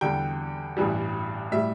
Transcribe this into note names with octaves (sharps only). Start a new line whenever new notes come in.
E2 D3 G3 G5
A1 G2 E3 G3
A2 G3 E5